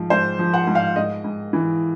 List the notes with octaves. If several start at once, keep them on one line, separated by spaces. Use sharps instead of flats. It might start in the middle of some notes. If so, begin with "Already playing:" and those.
Already playing: G#2 F3
G#2 C5
F3
F#5
G#2
F5
G#2 D#5
G#2
E3